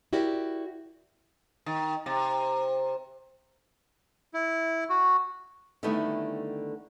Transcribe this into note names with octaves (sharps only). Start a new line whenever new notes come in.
E4 F#4 G4 A#4 D5
D#3
C3
E4
F#4
D3 D#3 G3 A3 B3 E4